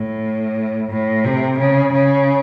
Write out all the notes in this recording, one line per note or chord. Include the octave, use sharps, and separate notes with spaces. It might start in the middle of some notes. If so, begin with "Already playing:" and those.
Already playing: A2
A2
C3
C#3
C#3